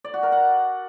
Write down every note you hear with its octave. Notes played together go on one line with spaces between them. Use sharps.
D5
F#4
A#4
F#5